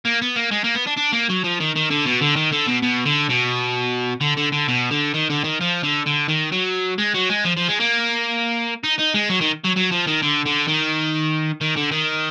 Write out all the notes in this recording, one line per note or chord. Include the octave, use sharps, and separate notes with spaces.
A#3
B3
A#3
G#3
A#3
B3
D4
D4
A#3
F#3
F3
D#3
D#3
D3
B2
D3
D#3
D3
B2
B2
D3
B2
D3
D3
D3
B2
D3
D#3
D3
D#3
F3
D3
D3
D#3
F#3
G#3
F#3
G#3
F3
F3
G#3
A#3
D#4
D#4
G#3
F#3
D#3
F#3
F#3
F3
D#3
D3
D3
D#3
D#3
D3
D#3